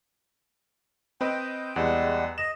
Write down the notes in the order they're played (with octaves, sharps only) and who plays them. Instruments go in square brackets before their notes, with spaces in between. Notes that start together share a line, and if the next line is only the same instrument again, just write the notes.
[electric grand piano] C4 B4 D#5 [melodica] G5
[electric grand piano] E2 [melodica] G3 G#3 F#5
[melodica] D#5 [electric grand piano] E7